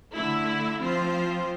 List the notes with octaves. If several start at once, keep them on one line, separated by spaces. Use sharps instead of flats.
D3 A3 E4
F3 C4 F4 C5